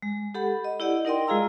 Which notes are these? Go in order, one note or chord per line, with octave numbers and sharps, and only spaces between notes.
G#3
G4 A4 F#5 B5
D#5
E4 G4 D5 D#5 F#5
D#4 A#4 D5 D#5 G5 C6
G#3 F4 G#4 F5 A#5 E6